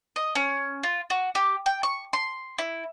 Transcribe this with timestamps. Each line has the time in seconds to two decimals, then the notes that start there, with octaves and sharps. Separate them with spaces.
0.16 D#5
0.35 C#4
0.83 F4
1.10 F#4
1.35 G4
1.66 G5
1.83 C#6
2.13 C6
2.59 E4